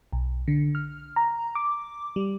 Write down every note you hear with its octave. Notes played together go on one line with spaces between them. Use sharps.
B1
D3
F6
A#5
D6
G3